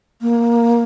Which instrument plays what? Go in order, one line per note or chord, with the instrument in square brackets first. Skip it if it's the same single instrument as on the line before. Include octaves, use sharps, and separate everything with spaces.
[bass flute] A#3